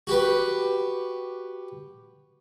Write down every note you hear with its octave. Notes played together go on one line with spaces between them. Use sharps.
F#4 G4 B4